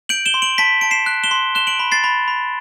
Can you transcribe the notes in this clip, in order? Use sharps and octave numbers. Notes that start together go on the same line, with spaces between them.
G6 D7 F#7
E7 G7
C6
D7 F#7
A5 B6 D7
A5 D7
C7 E7
F#6
E7 G7
C6
F#6 E7 G7
D7 F#7
B5
A6 C7
B5
B5